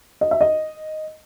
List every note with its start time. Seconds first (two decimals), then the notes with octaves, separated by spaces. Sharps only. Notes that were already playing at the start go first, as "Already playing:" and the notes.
0.21 D#5
0.31 E5
0.41 D#5